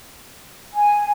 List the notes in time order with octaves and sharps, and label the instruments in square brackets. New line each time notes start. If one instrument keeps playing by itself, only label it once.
[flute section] G#5